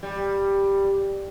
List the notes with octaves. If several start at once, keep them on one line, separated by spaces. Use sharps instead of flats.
G3